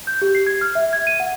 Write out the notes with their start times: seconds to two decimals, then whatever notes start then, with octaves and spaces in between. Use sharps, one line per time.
0.07 G6
0.22 G4
0.35 C7
0.47 G#6
0.61 F6
0.75 E5
0.93 G#6
1.07 D#7
1.20 F#5